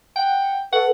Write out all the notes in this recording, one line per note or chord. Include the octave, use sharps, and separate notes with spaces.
F#5 G5
A4 B4 F#5